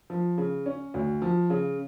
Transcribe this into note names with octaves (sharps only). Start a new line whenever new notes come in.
F3
C#3
C#4
D2
F3
C#3